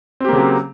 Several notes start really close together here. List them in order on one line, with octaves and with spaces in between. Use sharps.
C4 G4 A#3 C#3 F#3